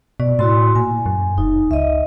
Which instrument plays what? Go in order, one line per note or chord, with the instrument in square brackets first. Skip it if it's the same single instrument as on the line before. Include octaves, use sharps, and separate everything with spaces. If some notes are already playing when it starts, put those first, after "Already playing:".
[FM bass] B2 [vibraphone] D5
[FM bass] A2 [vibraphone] E4 F#4 C6
[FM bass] A#2 [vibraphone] G#5
[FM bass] F#2
[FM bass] F1 [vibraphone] D#4
[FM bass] C#2 [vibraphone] D#5 E5